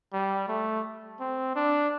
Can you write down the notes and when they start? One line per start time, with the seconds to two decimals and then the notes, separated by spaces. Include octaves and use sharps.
0.13 G3
0.48 A3
1.20 C4
1.56 D4